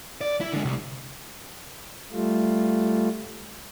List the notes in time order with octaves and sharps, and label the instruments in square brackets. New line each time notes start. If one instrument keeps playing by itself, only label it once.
[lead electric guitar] D5
E4
D3 G#3
C2
[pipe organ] G3 A3 F4